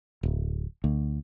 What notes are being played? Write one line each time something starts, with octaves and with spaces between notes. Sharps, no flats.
D1
D2